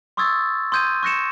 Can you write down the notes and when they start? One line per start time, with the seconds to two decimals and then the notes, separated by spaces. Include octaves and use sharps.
0.17 C6 C#6 D#6 E6 G#6 A6
0.72 C6 D#6 G6 G#6 D#7
1.03 C#6 F#6 A#6 C#7 E7